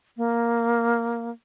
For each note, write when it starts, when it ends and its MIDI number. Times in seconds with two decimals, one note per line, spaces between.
0.17 1.30 58